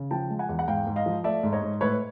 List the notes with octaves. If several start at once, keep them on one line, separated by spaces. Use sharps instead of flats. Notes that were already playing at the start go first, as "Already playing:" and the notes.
Already playing: C#3
F3 G5 A5
G#3
F#5 G#5
E2
F#5
G#2 F5 G5
G#2
D#5 F5
F3
A3 D5 E5
G#2
C#5 D#5
G#2
A2 B4 C#5